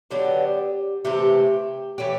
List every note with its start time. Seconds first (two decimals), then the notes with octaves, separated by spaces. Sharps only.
0.11 D3 F#3 B3 D4 G4
1.05 C3 E3 A3 G4
1.98 E3 A3 C#4 G4